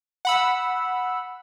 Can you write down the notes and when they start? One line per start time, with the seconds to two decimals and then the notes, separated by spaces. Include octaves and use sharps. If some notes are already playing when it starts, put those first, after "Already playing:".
0.25 F#5 B5 E6